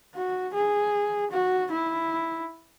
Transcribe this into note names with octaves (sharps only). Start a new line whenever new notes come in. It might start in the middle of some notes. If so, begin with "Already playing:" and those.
F#4
G#4
F#4
E4